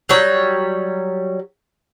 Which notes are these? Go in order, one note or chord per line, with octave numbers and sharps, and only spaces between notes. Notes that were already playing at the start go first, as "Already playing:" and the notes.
F#3 G3 C#5